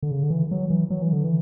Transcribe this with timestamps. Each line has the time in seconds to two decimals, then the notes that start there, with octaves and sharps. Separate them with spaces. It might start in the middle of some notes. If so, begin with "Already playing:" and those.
0.03 D3
0.11 C#3
0.23 D3
0.30 E3
0.51 F#3
0.70 E3
0.90 F#3
1.02 E3
1.13 D3
1.24 E3